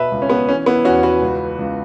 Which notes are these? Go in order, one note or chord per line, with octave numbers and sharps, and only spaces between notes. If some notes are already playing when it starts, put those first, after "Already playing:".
Already playing: B2 B4 E5
C#2
C#4
B3
E3 C#4
B3 E4
E2 C#4 F#4
F#4 B4
C#2
C#2